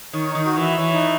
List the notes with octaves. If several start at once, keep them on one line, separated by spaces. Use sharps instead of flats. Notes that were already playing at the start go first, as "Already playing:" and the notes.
D#3 C#5
D#4
D#3
F#4
E3
E5
E3 C#5
D#4